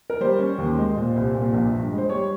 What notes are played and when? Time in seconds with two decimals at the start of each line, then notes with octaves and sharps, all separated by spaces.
0.10 A#4
0.20 G3 C5
0.39 C#4
0.58 D#2
0.78 G#3
0.96 A#2
1.16 C2
1.35 A#2
1.53 A#1
1.73 G2
1.92 G#3
1.98 C5
2.09 G3 C#5